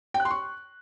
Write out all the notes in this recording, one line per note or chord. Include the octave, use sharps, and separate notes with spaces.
G5
F#6
C6
C#6